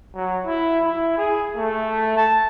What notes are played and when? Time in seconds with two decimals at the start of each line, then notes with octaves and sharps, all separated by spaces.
0.14 F#3
0.46 E4
0.84 E4
1.18 G#4
1.56 A3
2.17 A5